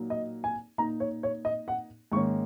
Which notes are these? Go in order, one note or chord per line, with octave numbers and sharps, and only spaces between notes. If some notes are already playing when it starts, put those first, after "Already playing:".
Already playing: A#2 F#3 A#3 D#4
D#5
G#5
A#2 A#3 D#4 A#5
C#5
C#5
D#5
F#5
G#2 D#3 A#3 C#4 C#6